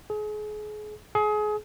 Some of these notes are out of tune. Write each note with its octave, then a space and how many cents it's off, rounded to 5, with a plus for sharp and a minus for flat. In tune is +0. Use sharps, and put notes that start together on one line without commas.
G#4 +35
G#4 +30